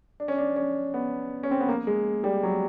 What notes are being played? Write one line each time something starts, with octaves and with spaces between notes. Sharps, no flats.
D4
C#4
D4
C#4
B3
C#4
C4
B3
A#3
G#3
G3
F#3